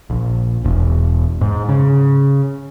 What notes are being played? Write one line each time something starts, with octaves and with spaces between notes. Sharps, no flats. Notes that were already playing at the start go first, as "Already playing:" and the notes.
A#1
E1
G#2
C#3